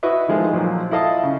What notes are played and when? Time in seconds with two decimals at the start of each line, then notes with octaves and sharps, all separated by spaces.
0.03 E4 F#4 B4 D#5 E5
0.28 D#3 F3 G#3 A3
0.53 A#2 F3 F#3
0.91 E4 F4 A4 D#5 F5 A5
1.23 C#3